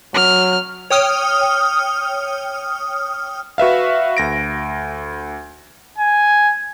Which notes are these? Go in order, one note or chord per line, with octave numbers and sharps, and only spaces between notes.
F#3 F6
C#5 G5 D#6 F6
F#4 B4 E5 F5
D2 A#6 D7
G#5